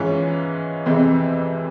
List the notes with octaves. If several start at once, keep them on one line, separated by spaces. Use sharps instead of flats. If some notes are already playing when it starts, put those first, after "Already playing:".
Already playing: G#2 E3 G#3 C#4 F4
F2 C3 E3 G#3 C4